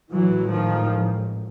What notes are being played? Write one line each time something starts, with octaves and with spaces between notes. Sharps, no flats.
A1 G#2 E3 F#3
D#3 F3